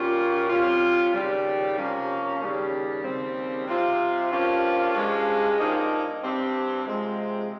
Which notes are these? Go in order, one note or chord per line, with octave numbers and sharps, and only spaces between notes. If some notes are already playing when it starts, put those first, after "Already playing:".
Already playing: A#2 G3 A#3 C#4 F4
C3 G3 C#4 F4
D#2 C#3 G3
C3 F3 A#3 C#4
D#2 C#3 G3
D#2 C#3 G3 C4
C3 G3 C4 F4
G2 F3 A#3 C#4 F4
G2 F3 G#3 C#4
G2 F3 A#3 D#4
G2 G3 C4
C3 F3 G#3 C4